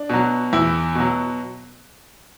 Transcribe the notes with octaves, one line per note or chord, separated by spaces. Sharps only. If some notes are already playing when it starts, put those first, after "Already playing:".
Already playing: D4
B2 F#3
E2 E4
B2 F#3